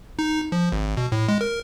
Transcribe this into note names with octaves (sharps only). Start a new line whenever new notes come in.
D#4
F3
G#1
B2
A2
G#3
A#4